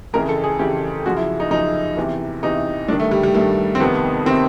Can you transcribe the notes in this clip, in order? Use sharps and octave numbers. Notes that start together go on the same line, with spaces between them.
F2 C#3 E3 A#4
A4
G#4
F2 C#3 E3 G4
F#2 C#3 F3 F#4
E4
D#4
F#2 C#3 F3 D#4
E2 C3 E3
E2 C3 E3 D#4
G2 D#3 D4
A3
G3
G3
G2 D#3 A3
C4
F2 C3 D#3 B3
C3 D#3 C4